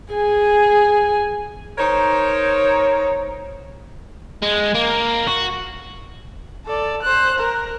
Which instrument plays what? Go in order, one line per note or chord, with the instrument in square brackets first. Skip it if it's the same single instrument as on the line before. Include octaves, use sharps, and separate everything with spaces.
[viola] G#4 G#5
[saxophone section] D#4 A#4 C5 C#5
[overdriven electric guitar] G#3
A#3
F#4
[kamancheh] A4 D5
C5 F#6
A#4